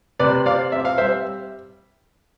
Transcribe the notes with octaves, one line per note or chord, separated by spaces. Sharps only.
C3 B4 D5
C4 D5 F5
C4 E5
F5
G3 C5 E5